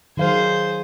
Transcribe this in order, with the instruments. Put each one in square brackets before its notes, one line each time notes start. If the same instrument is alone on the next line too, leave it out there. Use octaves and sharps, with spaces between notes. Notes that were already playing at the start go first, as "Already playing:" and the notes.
[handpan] D#3 F#3 F5 [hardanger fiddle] G#4 C5